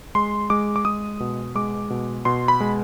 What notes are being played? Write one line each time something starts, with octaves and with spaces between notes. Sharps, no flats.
G#3 C6
G#3 D6
D6
G#3 D#6
B2
G#3 D6
B2
B2 C6
B5
G#3